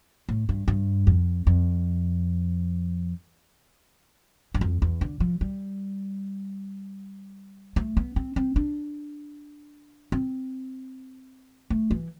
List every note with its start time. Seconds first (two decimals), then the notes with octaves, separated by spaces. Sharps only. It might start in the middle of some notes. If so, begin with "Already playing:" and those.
0.29 A2
0.49 G2
0.68 G2
1.07 F2
1.47 F2
4.54 G2
4.61 F2
4.82 E2
5.01 D3
5.20 F3
5.41 G3
7.76 A3
7.97 B3
8.16 C4
8.36 C4
8.56 D4
10.12 C4
11.70 A3
11.91 E3